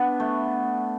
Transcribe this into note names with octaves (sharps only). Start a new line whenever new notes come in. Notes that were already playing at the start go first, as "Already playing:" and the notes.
Already playing: B3 D4
A3